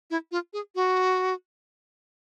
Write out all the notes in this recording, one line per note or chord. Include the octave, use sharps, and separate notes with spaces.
E4
F4
G#4
F#4